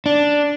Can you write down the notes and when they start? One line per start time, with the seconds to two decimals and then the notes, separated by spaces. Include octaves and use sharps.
0.06 D4